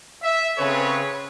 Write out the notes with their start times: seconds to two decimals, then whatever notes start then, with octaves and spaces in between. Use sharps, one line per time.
0.23 E5
0.58 C#3 C4 G#4 A4 B4 C#5